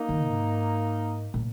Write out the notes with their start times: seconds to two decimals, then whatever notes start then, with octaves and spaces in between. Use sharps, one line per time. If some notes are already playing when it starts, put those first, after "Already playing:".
Already playing: A#3 D#4
0.09 D#3
0.27 G#2
1.34 A#2